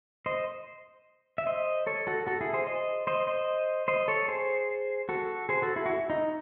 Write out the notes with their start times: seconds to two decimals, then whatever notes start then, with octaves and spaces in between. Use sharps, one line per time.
0.26 C5 D#5
1.38 E5
1.47 C5 D#5
1.87 A4 C#5
2.07 F#4 A4
2.27 F#4 A4
2.41 E4 G#4
2.53 G#4 C5
2.67 C5 D#5
3.07 C5 D#5
3.27 C5 D#5
3.88 C5 D#5
4.08 A4 C#5
4.28 G#4 C5
5.09 F#4 A4
5.49 G#4 C5
5.62 F#4 A4
5.76 E4 G#4
5.86 F#4
5.90 E4
6.10 D#4